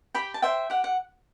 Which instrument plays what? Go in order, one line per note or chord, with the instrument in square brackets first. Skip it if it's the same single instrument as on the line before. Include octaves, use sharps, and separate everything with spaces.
[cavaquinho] G4 G5 B5
A5
C5 E5 G5
G4 F#5
F#5